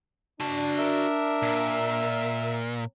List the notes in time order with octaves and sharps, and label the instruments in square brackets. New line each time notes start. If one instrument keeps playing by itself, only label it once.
[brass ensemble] D4 [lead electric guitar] F#4 A5
[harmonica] A#4 E5
[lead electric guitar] A#2